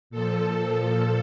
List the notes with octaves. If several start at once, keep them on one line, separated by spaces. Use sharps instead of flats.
A#2 F3 A4